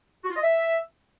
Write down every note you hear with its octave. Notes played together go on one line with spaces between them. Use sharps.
F#4
F4
D#5
E5